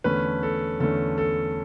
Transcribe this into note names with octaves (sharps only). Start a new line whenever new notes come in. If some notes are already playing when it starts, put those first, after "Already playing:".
E2 D3 A3 C#4 B4
A4
E2 D3 A3 C#4 A4
A4